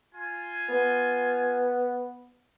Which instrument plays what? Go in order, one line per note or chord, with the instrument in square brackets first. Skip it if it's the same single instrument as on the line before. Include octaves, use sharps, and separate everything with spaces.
[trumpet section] F4 G#5
[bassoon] B3